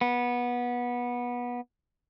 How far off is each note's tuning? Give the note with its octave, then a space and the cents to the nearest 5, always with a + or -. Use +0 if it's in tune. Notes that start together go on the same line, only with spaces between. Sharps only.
B3 -20